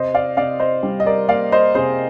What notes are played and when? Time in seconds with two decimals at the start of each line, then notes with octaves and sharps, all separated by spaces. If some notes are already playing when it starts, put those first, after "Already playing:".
Already playing: C3 C5 D#5
0.14 D5 F5
0.37 C3 D5 F5
0.60 C5 D#5
0.83 G3
1.00 D#5
1.06 A#4 D5
1.29 A#3 D5 F5
1.52 C5 D#5
1.75 C3 G#4 C5